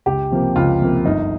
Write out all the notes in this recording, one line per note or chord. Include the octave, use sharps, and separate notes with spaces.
C#2 G4
C3 F3 A#3
C#2 F4
C3 F3 A#3
G1 D#4